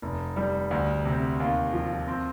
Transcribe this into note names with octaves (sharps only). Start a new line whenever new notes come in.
F1
G3
D2
C3
D#2
F3
C4